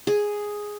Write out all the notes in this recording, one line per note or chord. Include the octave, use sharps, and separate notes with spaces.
G#4